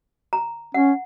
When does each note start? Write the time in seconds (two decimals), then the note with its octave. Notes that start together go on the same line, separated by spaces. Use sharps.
0.33 A#5
0.74 C#4 F#5